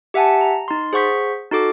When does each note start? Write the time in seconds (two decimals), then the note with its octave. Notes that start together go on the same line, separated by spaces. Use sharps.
0.14 G4 E5 F#5 G#5 A5
0.41 A#5
0.68 D#4 C6
0.93 G#4 C5 F#5 C#6 G6 B6
1.51 D#4 F#4 A4 D6